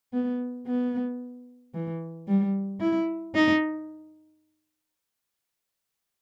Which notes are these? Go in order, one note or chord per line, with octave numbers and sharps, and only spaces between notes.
B3
B3
E3
G3
E4
D#4